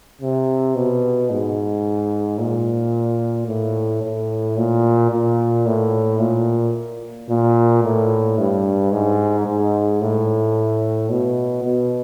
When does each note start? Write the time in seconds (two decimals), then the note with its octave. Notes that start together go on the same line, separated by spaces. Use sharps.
0.22 C3
0.76 B2
1.31 G#2
2.39 A#2
3.47 A2
4.03 A2
4.57 A#2
5.11 A#2
5.66 A2
6.20 A#2
7.29 A#2
7.84 A2
8.38 G2
8.92 G#2
9.46 G#2
10.01 A2
11.10 B2
11.64 B2